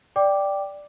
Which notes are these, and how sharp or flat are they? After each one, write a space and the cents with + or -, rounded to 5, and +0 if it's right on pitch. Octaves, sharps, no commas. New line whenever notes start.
D5 +0 G5 +0 D6 +0